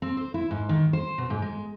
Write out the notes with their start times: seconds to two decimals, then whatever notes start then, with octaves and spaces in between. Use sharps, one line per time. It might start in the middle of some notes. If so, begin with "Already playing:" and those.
0.02 C4
0.17 C5
0.34 E4
0.51 G#2
0.69 D#3
0.93 C5
1.18 B2
1.30 G#2
1.42 G#3